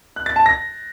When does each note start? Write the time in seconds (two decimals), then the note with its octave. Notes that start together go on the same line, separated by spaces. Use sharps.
0.16 F#6
0.26 A6
0.36 A5
0.46 A#6